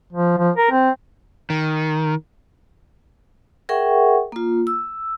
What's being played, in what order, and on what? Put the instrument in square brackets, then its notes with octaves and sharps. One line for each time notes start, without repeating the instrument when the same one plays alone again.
[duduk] F3
F3
A#4
C4
[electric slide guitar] D#3
[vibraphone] G#4 A#4 E5 F#5 G5 C#6
A#3 F4
E6